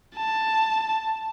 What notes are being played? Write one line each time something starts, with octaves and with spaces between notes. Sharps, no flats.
A5